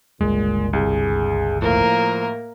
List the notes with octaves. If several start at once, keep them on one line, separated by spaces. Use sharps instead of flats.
G1 C#2 G2 A#2 G#3
C2 G#4
A2 F3 A#3 A#4